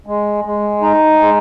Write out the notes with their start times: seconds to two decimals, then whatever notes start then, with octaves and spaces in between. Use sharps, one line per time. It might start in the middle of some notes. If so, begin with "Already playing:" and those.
0.06 G#3
0.44 G#3
0.82 D#4
1.19 G#3